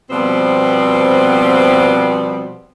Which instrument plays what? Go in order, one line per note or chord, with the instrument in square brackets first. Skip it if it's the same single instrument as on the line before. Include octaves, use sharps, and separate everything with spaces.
[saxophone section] B2 F3 G3 B3 C4